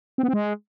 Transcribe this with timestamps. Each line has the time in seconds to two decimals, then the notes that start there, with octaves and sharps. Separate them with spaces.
0.18 C4
0.23 B3
0.28 C4
0.33 G#3